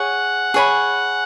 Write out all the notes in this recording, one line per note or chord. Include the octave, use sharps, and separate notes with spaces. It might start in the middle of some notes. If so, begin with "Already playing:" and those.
Already playing: G#4 C#5 F#5 G#5
G#4 C#5 G#5 B5